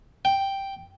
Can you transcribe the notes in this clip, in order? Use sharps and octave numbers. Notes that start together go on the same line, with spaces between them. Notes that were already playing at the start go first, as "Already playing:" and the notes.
G5